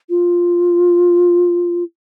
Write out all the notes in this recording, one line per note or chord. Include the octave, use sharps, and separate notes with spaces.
F4